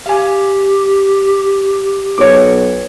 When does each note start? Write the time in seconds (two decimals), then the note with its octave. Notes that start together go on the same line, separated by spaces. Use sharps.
0.06 G4 F5 G#5
2.18 B1 C#5 D6